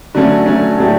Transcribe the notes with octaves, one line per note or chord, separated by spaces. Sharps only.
D3 F#3 A3 C#4
D3 F#3 A3 C#4
A2 F#3 A3 D4 G4